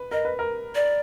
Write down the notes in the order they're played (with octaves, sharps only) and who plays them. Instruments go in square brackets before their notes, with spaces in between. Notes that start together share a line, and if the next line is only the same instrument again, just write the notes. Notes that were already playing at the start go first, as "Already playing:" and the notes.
Already playing: [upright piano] B4
[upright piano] A#4 [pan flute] D#5
[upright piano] B4
A#4
[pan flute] D5